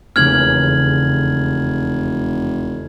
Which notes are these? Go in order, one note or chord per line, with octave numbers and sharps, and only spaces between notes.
F1 E2 C#3 A#3 F6 G#6 F#7